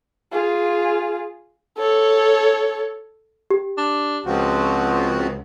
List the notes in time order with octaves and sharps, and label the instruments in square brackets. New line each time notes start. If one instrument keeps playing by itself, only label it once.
[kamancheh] F4 G#4
A4 C#5
[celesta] G4
[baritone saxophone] D4
[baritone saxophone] C#2 [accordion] F3 C4 F#4